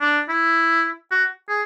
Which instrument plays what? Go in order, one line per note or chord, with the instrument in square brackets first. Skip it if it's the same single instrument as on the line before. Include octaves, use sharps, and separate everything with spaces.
[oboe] D4
E4
F#4
G#4